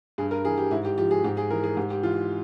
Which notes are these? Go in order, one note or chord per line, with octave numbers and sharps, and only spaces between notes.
G2 G#4
A#4
E3 G#4
G4
G#2 E4
G4
F3 G4
G#4
G#2 G4
G#4
E3 A#4
G#4
G#2 G4
G4
E3 F4